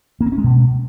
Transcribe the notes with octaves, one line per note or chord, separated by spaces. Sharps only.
A#3
C4
C#4
G#3
B2